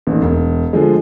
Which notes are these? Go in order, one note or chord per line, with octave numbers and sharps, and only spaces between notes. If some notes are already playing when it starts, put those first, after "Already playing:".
A1 D#2
E1
D3 F3 G#3